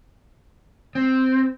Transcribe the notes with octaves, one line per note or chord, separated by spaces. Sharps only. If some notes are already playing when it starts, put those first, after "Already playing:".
C4